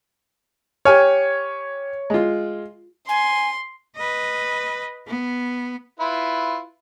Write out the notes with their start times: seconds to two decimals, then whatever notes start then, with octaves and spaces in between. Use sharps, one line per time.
0.85 G4 C#5 G#5 F6
2.10 G#3 F4
3.09 G#5 C6
3.96 B4 D#5
5.07 B3
6.00 E4 F4 B4